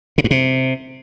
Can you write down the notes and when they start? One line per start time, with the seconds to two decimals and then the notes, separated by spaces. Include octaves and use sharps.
0.18 C#3
0.24 G2
0.31 C3